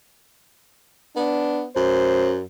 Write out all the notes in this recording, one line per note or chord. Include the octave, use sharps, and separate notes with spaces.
B3 D4
F#2 C5